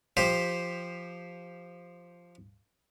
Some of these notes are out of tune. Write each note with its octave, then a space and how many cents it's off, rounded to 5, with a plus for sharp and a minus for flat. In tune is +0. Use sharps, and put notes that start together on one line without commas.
F3 +0 G4 +10 C5 +0